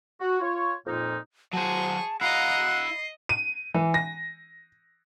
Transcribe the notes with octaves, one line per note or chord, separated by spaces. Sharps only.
F#4
F4 C#5
F2 A#2 A#3 D#4
F#3 G#4 C5 A5 C#6
E4 D#5 F5 F#5 A#5 C7
D#5
D#7
E3
A#6